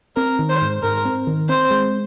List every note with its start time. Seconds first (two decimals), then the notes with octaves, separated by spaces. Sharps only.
0.16 C4 A#4
0.39 D#3
0.49 C5
0.61 G#2
0.83 G#2 A#4
1.05 C4
1.27 D#3
1.49 C4 C5
1.70 G#3